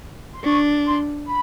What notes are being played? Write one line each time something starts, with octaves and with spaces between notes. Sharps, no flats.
C6
D4 C#6
C6
B5